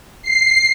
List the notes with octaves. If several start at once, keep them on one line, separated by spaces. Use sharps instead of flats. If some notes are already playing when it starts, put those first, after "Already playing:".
C7